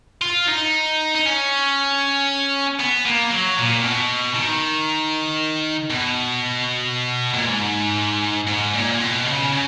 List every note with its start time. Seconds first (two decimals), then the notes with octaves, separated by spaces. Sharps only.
0.22 F4
0.48 D#4
1.16 D#4
1.26 C#4
2.80 B3
3.05 A#3
3.31 F#3
3.58 A#2
3.83 B2
4.35 D#3
5.90 B2
7.34 A#2
7.46 G#2
8.48 G#2
8.75 A#2
9.00 B2
9.26 C#3
9.52 C#3